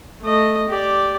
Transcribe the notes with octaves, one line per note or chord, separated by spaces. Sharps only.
A3 D#5
G4 D5